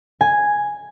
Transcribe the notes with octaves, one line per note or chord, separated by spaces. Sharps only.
G#5